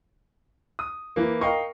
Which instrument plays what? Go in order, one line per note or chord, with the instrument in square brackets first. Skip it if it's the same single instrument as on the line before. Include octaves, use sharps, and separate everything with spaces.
[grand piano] D#6
E3 A#3
[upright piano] A#4 G5 C#6 [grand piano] D#5 F5